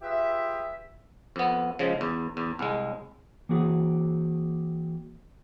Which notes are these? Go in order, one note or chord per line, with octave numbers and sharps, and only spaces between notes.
F4 G4 G#4 B4 E5
F2 B3
C#3 F3 G#3
E2
E2
C2 G#3
E3 A#3 C4 F#4 G#4